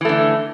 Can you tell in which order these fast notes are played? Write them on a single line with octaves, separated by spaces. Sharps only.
E3 A3 D3